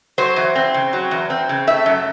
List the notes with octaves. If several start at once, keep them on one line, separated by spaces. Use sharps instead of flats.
F#3 C5
E2
C4
C#3
F#3
E2
C4
C#3
A3 E5
F#2